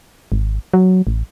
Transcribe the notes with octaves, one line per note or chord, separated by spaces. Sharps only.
G#1
F#3
A1